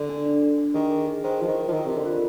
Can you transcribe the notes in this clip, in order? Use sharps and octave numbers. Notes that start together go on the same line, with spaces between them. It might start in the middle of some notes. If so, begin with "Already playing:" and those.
Already playing: D3
D4
D4
D4
D4
D#3 G#4
G#4
G#4
D#3 C5
F3 C5
D#3
C5
F3
D#3 A#4
C3 A#4
D3
F4